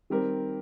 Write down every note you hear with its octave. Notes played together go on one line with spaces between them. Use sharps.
D#3 G3 C4 G4 A#4